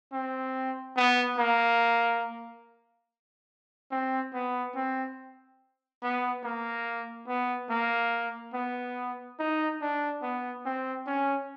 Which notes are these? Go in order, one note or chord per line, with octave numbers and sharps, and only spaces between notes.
C4
B3
A#3
C4
B3
C4
B3
A#3
B3
A#3
B3
D#4
D4
B3
C4
C#4